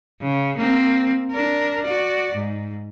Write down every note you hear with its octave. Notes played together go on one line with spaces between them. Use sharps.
C#3
A#3 C4
D4 A#4
F#4 D5
G#2